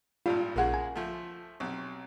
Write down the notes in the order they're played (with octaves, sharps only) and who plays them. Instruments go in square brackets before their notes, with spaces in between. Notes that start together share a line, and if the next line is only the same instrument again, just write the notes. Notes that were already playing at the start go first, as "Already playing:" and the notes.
[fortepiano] G#1 A#2 G3 [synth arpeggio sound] F4
[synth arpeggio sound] A#1 F#5 [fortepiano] C#3 G#3 A#3
[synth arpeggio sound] G#5
[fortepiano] F3 A3
B1 C3